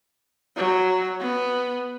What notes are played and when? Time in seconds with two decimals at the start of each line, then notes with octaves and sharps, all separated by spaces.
0.56 F#3
1.20 B3